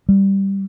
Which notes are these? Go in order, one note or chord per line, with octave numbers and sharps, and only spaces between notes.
G3